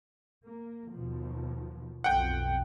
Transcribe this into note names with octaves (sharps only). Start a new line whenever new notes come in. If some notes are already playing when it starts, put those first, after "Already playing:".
A#3
D#2 B2 F3
B1 F2 F#5 G5